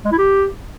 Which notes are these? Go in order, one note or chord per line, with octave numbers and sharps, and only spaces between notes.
G#3
E4
G4